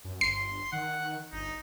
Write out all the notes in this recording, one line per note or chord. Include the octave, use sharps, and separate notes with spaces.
F#2
G1 C6 C7
D#3 F#5
G1 D#4